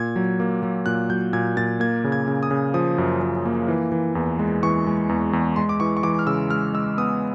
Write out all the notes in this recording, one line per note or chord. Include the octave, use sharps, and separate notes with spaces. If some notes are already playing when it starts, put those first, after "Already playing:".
Already playing: A#2 G#6
F#3
A#3
F#3
A#2 F#6
F#3 G6
A#2 G#6
A#2 A6
A#3 G#6
C#3
G#6
C#3
D#6
C#3
F3 D#6
F#2
F3
A#3
E3
E3
E2
G#3
E3 C#6
G#3
E2
E2
G#3 C6
D6
E3 C#6
C#6
E3 D6
F6
C#3 E6
G#3 F6
G#3 E6
B3 D#6